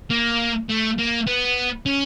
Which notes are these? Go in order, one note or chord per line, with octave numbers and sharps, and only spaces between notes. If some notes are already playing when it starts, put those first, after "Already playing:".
A#3
A3
A#3
B3
C#4